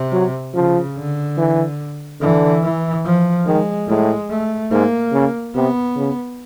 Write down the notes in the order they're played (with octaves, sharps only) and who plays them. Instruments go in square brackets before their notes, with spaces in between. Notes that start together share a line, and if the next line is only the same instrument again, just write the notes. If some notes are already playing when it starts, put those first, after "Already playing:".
Already playing: [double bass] C3
[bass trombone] F#3
[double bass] C#3 [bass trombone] F3
[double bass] D3
[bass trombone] E3
[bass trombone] D3 [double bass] E3
[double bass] E3
F3
[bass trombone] D#3 [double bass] G#3
[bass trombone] A2 [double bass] G#3
[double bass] A3
[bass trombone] G#2 [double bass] A#3
[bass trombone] C#3
[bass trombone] C3 [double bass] B3
[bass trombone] C#3